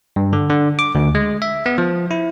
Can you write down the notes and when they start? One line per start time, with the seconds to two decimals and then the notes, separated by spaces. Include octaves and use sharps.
0.16 G2
0.33 D3
0.49 D3
0.79 D6
0.95 D2
1.15 G#3
1.42 E5
1.66 B3
1.78 F3
2.11 E4